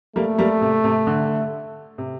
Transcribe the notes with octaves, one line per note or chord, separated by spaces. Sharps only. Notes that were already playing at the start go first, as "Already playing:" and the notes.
G3 A3 A#3
G3 A#3
C3
C3
D3
C3